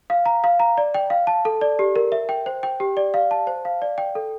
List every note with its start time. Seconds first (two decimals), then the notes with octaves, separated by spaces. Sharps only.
0.10 F5
0.26 A#5
0.44 F5
0.60 A#5
0.78 D5
0.94 G5
1.10 F5
1.27 A5
1.45 A4
1.61 D5
1.79 G4
1.96 A#4
2.12 E5
2.29 G5
2.46 C5
2.63 G5
2.80 G4
2.97 D5
3.14 F5
3.31 A5
3.47 C5
3.65 F5
3.82 D5
3.98 G5
4.15 A4